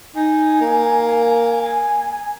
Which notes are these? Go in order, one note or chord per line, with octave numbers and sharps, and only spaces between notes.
D#4 G#5
A#3
G#5